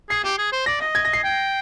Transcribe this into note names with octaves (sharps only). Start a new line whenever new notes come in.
G#4 C7
G4
G#4
C5
D5 A#6
D#5
G#6
A#6
C7
G5